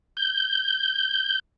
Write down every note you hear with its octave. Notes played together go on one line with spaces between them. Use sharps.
G6